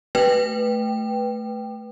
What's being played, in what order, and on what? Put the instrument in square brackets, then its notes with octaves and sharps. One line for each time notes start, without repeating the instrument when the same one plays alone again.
[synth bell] A3 B4 G5